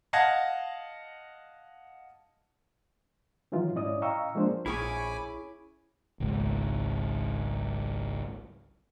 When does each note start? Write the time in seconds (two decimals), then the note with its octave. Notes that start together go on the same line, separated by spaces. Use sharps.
0.13 D#5 F5 F#5 A5 G#6 A#6
3.52 D#3 E3 F#3 D#4 F4
3.76 G#2 C#4 E4 D5 D#5 D#6
4.02 D#5 F5 G5 A#5 C#6 E6
4.35 F3 G#3 A#3 D4 C5
4.66 A#1 C#4 E4 G#4 G#5 B5 C#6 D6
6.20 G#1 C#2